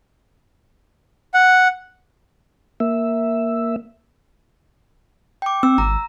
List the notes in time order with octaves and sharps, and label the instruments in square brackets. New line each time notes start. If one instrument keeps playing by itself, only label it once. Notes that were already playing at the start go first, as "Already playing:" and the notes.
[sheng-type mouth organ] F#5
[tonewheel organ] A#3 E5
[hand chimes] G5 D6
[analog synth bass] C4 [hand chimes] E6
[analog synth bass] G#1 [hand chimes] A#5